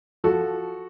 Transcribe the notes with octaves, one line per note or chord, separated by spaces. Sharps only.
F3 F#4 A4